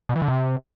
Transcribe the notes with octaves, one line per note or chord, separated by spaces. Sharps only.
B2
E3
D3
C3